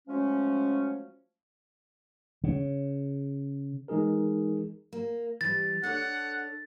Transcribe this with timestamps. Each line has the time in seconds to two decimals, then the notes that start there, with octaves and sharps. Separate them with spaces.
0.07 F3 F#3 G#3 A3 C#4
2.44 C#3
3.88 E3 G#3 D#4 G#4 A#4
4.93 A#3
5.41 E3 G3 A6
5.83 D4 A4 C#5 F#5